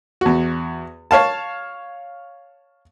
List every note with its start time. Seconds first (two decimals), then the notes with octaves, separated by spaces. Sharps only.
0.21 E2 F#4
1.11 C#5 F5 A5